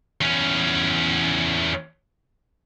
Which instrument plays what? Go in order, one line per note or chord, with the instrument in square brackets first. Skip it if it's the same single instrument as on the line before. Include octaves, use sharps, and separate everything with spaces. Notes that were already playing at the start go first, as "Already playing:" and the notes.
[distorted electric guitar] E2 C#4